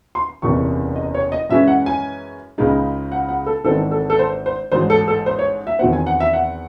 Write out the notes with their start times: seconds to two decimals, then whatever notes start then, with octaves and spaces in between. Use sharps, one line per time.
0.15 C6
0.42 F#1 E2 C3 C#6
0.96 D#5
1.14 C#5
1.32 D#5
1.50 F#2 E3 G#3 C#4 E5
1.68 F#5
1.86 G#5
2.58 C#2 C#3 G#3 D#4
3.12 F#5
3.29 F#5
3.46 A4
3.64 G#1 G#2 E3 C4 D#4 A4
3.91 A4
4.10 A4
4.19 C5
4.46 C5
4.72 A1 G#2 F#3 C5
4.90 A4
5.08 A4
5.26 C5
5.39 C#5
5.67 E5
5.79 E2 D#3 F#3 C4 F#5
5.93 G#5
6.07 F#5
6.20 E5
6.33 F#5